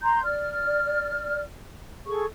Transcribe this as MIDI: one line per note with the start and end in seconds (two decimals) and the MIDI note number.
0.03 0.21 82
0.03 0.21 84
0.03 0.21 91
0.24 1.42 74
0.24 1.42 89
2.07 2.25 68
2.07 2.25 69
2.07 2.25 85